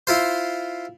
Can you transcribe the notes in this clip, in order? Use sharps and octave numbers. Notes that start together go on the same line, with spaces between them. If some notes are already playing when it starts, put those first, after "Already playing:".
E4 F4 C5